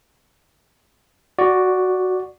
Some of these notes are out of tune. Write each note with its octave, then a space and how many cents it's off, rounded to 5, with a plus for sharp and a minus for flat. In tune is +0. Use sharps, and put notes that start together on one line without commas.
F#4 +0 D5 +0